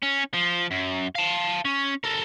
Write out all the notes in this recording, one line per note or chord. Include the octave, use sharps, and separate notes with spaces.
C#4
F3
F#2
F5 A5
C#4
A4 A#4